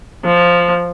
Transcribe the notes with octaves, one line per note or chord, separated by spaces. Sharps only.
F3